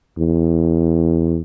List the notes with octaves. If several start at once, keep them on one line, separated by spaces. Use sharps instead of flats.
E2